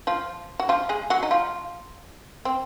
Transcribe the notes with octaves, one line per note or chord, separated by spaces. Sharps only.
F3 F4
F#4
F3 F4
G#3 G#4
F#3 F#4
D#4
F3 F4
C4